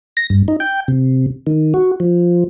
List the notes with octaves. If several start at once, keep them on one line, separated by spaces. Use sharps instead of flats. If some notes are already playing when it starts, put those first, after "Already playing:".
A#6
G2
D#4
G5
C3
D#3
F#4
F3